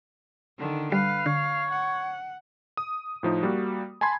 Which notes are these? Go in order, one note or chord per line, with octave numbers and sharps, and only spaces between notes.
D3 D#3
G3 B4 F5
D3 C#5
F#5
D#6
A2 F3 D#4
G3 A#3 F#4
G#5 A5 B5 C6 G#6